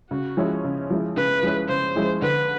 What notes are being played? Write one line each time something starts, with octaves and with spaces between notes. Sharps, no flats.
C#3 F#4
F3 G#3 C#4 E4
C#3
F3 G#3 C#4 E4
C#3 B4
F3 G#3 C#4 E4
C#3 C5
F3 G#3 C#4 E4
D3 B4